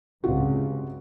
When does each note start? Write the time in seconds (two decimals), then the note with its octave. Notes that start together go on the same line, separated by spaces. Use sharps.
0.24 C#2 G2 C3 F4 F#4